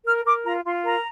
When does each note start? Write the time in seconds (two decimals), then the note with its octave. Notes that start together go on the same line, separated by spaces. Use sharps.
0.05 A#4 F6
0.25 A#4 D6
0.44 F4 A#5
0.64 F4 C6
0.83 A#4 A#5